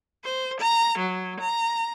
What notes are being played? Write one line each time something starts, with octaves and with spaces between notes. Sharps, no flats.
C5
A#5
F#3
A#5